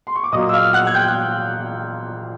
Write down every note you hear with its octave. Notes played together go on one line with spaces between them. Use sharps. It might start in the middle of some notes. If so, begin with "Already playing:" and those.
C6
C#6
D6
A#2 F#3 A#3 D#5 D#6
E6
F5 F6
F#5 F#6
G#6
G5 G6
F#6